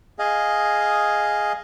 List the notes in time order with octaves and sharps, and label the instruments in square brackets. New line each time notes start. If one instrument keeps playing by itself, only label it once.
[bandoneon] G#4 D#5 F5